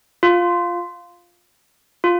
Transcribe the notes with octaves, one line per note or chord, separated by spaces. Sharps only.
F4
F4